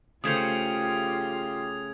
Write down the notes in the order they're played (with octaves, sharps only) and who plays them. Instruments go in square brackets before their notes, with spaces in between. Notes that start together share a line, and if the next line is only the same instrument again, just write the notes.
[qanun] C#3 A3 C5 [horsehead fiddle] F4 G4 [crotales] D#6 G#6 F7